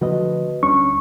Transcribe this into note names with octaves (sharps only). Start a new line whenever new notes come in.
D3 F3 A3 F#4 B4 D#5
D2 G3 C#4 D4 C#6